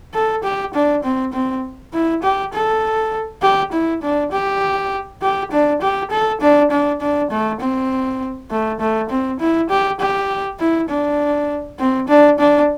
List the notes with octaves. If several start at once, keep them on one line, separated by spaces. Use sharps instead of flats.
A4
G4
D4
C4
C4
E4
G4
A4
G4
E4
D4
G4
G4
D4
G4
A4
D4
D4
D4
A3
C4
A3
A3
C4
E4
G4
G4
E4
D4
C4
D4
D4